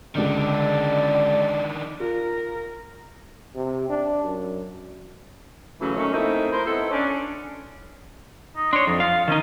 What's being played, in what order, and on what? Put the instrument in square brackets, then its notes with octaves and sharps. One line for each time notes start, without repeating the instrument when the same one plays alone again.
[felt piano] C#2 D3 [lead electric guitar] D#3 D4 [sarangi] D5
[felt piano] F4 [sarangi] A#4
[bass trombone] C3
D4
F#2
[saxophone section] C#3 E3 F#3 A3 C#4
A#2 D#3 F#3 A3 C#4
A3 A#3 C4 D#4 E4
E4 A#4 C5
B3 C4 D#4 E4 A4
C#4 D4
[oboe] D#4
[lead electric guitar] D4 C#5 [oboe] C6
[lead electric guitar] F2 [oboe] D#4
[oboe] F4 [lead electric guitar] F5
[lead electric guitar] D#3 D#4 [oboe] C#4